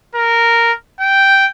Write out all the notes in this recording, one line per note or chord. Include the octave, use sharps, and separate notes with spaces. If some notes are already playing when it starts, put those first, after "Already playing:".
A#4
G5